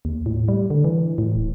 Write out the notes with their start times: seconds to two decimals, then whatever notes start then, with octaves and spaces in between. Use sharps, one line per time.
0.05 D#2
0.26 A2
0.48 G3
0.70 D3
0.84 E3
1.18 A2
1.35 D1